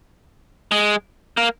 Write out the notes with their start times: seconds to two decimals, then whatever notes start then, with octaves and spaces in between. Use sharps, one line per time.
0.72 G#3
1.37 A#3